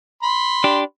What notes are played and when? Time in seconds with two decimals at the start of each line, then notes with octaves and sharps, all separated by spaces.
0.23 B5 C6
0.64 D4 G4